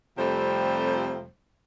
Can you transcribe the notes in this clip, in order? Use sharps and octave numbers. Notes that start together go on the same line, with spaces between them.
F2 C3 F3 G3 A3 C5